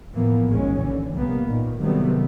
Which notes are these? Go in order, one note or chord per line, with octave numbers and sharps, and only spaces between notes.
A2 E3 F3 A#3 B3
A#1 D#2 G#2 G#3 C#4
D3 E3
C2 G3 A#3 B3
G#1 A#2 D#3
C3 D#3 F#3 G3 A3 B3